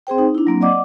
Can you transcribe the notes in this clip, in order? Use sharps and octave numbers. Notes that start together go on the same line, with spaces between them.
C4 G#4 C5 G5
D#4
D4 E4
F#3 A#3 C4
D5 D#5 F#5 D6